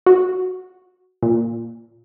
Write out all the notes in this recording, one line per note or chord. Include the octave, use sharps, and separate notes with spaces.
F#4
A#2